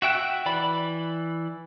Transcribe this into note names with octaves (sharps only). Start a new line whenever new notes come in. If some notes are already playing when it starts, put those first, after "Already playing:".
F#4 E5 G5 F#6
E3 D5 B5